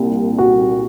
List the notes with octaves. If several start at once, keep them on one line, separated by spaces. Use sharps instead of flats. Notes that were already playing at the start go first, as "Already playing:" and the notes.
Already playing: C2 A#2
F#4